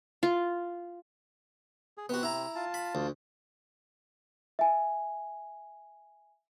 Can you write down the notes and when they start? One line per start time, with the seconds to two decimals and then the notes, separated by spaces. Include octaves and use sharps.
0.23 F4
1.98 G#4
2.09 C3 B3 F#4
2.23 E4 A#5
2.55 F4 A5
2.74 B5
2.95 D2
4.59 E5 G#5